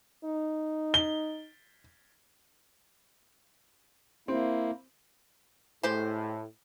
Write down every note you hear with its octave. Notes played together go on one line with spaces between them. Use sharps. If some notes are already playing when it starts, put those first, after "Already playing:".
D#4
G7
A#3 C4 E4
A2 G#3 G4 C5